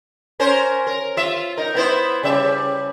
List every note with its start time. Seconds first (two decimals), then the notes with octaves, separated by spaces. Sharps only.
0.40 C#4 A#4 C5
0.87 A#4
1.17 F4 E5
1.57 D#4 A#4
1.75 B3 E4 C5
2.23 C#3 G3 E5